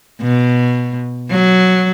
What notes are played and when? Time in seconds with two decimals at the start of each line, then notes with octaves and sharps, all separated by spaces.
0.22 B2
1.30 F#3